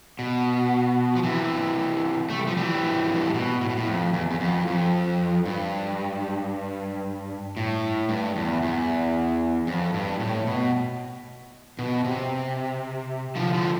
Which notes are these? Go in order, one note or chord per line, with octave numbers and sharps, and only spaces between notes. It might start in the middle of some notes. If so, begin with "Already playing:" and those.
B2
F3
C3 E3
A3
G3
F3
E3 G3
F2
G2
A2
B2
A2
B2
A2
F2
E2
E2
F2
F2
G2
A2
G2
E2
E2
F2
G2
A2
B2
B2
C3
D3 F3
D3 F3